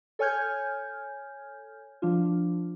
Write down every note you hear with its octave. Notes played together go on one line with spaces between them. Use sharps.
A4 C#5 G#5 F6 G6 G#6
F3 D4 F4